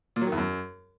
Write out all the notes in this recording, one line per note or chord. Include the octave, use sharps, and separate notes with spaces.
A#2
F#3
D#3
E2
F#2